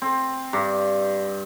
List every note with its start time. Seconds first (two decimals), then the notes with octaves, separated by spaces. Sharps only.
0.02 C4
0.53 G2